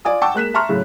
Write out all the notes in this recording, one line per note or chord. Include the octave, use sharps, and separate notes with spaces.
F4 D5 G#5 D#6
F#5 G5 A5 C#6 D6 E6
G#3 A#3 F#6 B6 E7
E5 A5 A#5 C6 C#6 F6
F#2 A2 C#3